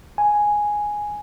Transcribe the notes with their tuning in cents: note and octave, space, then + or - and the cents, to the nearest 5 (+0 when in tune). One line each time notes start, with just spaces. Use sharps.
G#5 +0